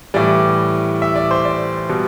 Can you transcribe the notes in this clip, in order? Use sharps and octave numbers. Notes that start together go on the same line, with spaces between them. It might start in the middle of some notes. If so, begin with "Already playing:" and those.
A2 E3 G3 D5
E5
D5
C5
D5
B2 G3